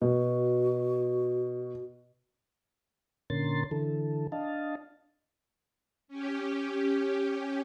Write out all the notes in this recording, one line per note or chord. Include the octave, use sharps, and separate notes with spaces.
B2 F#4
A#2 D3 C#4 A#4 C6 A6
D3 E3 A4
D4 D#5 F5 A5
C#4 G4